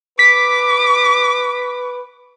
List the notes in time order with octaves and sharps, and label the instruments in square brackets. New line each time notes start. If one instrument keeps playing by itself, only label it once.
[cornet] B4 [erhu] D6 [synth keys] B6